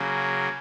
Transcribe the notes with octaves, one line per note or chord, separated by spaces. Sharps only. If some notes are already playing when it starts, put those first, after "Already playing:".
Already playing: C#3 F#3 A#3